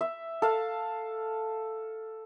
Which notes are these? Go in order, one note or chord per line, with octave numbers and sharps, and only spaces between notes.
E5
A4 F5